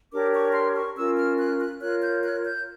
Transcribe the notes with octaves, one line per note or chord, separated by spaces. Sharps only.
D4 G4 A#4 C#5 D6
C#6
C6
C#6
C#4 F4 A#4 E6
F6
F#6
F#6
F4 A#4 C#5 F#6
G6
F#6
G6